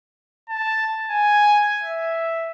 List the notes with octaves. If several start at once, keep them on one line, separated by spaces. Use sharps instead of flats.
A5
G#5
E5